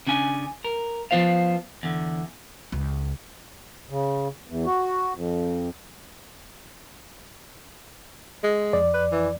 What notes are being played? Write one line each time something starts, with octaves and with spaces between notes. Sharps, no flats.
C#3 C#4 D4 G#5
A#4
F3 B3 F4 C5 F5
E2 D3
C#2
C#3
E2
F#4
F2
G#3
F2 D5
B4
E3